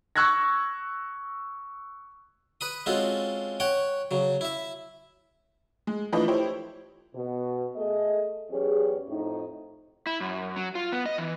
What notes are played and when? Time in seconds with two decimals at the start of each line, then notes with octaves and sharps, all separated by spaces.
0.16 C#6 E6 F#6 G#6 A#6
2.61 B4 B5 D#6
2.86 G#3 C4 C#4 F4 F#4 A4
3.60 C#5 F#5 G5
4.11 C#3 F#3
4.41 E4 E5
5.87 G#3
6.12 E3 F3 A3 D4 B4 D#5
6.28 E4 G4 C5 C#5
7.15 B2
7.76 A3 G#4 D#5
8.50 E2 F#3 C#4 G4 G#4
9.09 F2 A2 D#4
10.07 E4
10.21 F#2
10.56 F#3
10.75 F4
10.92 B3
11.06 D#5
11.18 E3